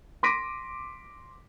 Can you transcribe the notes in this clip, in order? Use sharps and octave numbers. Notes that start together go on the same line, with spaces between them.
C6 D6 A#6 B6 D7 D#7